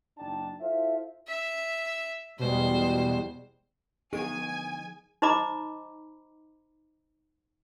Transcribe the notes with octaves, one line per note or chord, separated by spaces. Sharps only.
F#1 D4 D#4 G5 A5
E4 F4 A4 C5 E5
E5
E2 B2 G3 G#3 C5
D2 F3 B3 D#4 G#4 G#5 D7
D#4 C5 D#5 A#5 B5 D6